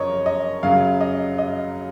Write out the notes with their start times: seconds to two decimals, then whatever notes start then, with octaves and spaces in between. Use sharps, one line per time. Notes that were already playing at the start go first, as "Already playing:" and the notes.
Already playing: F#2 C#3 F3 A#4 C#5 D#5
0.26 D#5
0.63 F#2 C#3 F#3 F5
1.01 D#5
1.38 D#5